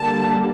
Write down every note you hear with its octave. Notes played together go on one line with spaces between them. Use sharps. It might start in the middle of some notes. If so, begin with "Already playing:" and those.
Already playing: D3 G3 A#3 A5